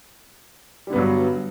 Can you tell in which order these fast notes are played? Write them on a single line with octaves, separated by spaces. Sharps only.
G3 D3 B3 G2 F#3